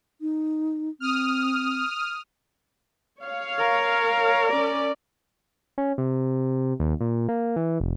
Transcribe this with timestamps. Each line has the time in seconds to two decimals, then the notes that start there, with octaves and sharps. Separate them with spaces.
0.21 D#4
1.00 C4 D#6 F6
3.23 C#5 F5
3.58 A#4
4.50 C#4 D5
5.78 C#4
5.98 C3
6.80 D#2
7.00 A#2
7.29 A#3
7.56 E3
7.80 F1